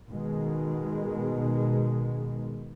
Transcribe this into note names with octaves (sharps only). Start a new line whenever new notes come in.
B2 D#3 G#3